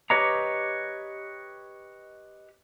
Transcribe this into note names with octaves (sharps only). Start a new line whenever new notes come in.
G4 B4 C#5 D#5 A#5